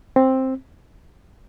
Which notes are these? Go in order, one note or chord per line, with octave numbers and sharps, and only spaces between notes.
C4